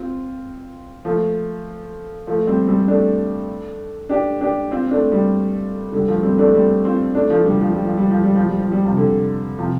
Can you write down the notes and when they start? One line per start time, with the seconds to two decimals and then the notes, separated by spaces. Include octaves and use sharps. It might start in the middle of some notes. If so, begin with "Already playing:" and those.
Already playing: C4 F4
1.05 F3 A3
2.27 F3 A3
2.47 G3 C4
2.67 G3 C4
2.88 A3 D4
4.09 D4 G4
4.41 D4 G4
4.71 C4 F4
4.91 A3 D4
5.12 G3 C4
5.92 D3 G3
6.08 F3 A3
6.23 G3 C4
6.38 A3 D4
6.54 G3 C4
6.85 C4 F4
7.15 A3 D4
7.30 F3 A3
7.45 D3 G3
7.61 F3
7.73 G3
7.85 F3
7.97 G3
8.11 F3
8.23 G3
8.36 F3
8.48 G3
8.60 F3
8.72 G3
8.85 C3 F3
8.97 D3
9.59 C3 F3